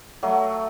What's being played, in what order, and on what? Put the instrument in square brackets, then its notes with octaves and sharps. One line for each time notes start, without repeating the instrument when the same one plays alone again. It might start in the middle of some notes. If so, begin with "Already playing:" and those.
[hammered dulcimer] F#3 A3